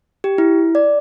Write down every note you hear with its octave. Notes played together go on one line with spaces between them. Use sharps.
G4
E4
D5